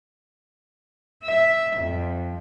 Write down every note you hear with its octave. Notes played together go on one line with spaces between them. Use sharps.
E5
F2